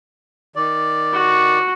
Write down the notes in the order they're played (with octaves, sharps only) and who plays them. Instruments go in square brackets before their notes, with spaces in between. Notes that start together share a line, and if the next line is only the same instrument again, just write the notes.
[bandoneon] D#3 D5
[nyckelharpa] F#4